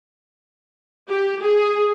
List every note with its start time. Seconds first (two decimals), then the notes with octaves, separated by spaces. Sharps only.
1.08 G4
1.42 G#4